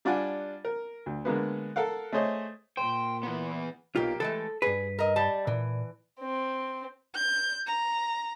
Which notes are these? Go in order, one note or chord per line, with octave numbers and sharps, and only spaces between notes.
G3 D4 F4 D5 F#5 G#5
A#4
D2
D3 G#3 A#3 B3
A4 A#4 F5 F#5
A3 G#4 C5 C#5 D#5
A#2 A#3 C5 G5
E3 B3
B1 A#2 A#3 F4 G4
E3 G#3 A3 A4
G2 G#4 B4
A#4 D#5
G3 A5
A#2 E3
C4
G6
A#5